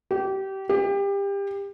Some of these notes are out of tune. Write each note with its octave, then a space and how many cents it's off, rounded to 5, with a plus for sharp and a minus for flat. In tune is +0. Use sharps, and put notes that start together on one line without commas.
G4 -25
G4 +25